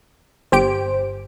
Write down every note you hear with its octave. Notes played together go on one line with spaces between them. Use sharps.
G1 G4 C5 D7